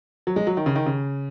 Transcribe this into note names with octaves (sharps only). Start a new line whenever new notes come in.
F#3
G#3
F#3
D#3
C#3
D#3
C#3